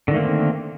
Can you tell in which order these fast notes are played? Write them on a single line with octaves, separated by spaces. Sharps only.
D3 D#3 A3 A#3 C4